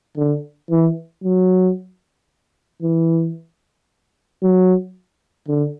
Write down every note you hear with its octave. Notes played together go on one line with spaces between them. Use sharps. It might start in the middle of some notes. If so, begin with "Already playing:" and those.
D3
E3
F#3
E3
F#3
D3